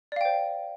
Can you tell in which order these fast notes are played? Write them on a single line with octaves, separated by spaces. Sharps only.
D5 F5 G5 C5